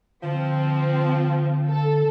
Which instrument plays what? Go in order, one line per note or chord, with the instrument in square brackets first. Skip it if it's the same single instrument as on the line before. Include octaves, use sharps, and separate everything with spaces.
[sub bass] D3 [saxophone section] F3 [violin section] C4
[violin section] A4